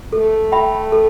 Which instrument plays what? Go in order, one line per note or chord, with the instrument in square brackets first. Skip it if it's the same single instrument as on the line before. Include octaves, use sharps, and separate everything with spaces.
[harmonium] A3 [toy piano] A4
[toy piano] E5 G5 B5
A4